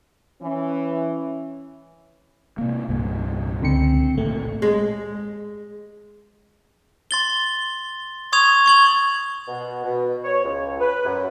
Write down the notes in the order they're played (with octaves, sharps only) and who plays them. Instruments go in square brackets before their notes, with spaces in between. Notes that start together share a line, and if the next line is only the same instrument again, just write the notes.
[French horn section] E3 C#4
[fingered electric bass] C3 A#3
C2 G2 A#2
[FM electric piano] C#2 D3 C#7 [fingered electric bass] C4
[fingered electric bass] G#1 A#2 A#3 [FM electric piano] A3
[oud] G#3
[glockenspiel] C6 A6 G7
C6 C#6 D#6 G#6 F7
C#6 G#6 F#7
[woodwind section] B2
B2
C#5
C#2
B4
F#2